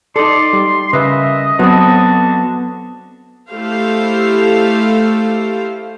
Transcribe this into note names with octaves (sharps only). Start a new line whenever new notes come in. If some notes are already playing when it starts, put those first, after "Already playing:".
D#4 A4 D5 C6
G3
C#3 A#3 E4 B4 D#5 E5
D3 F#3 B3 C4 F#4 B4 A5
A3 E4 G4 A4 C5 F5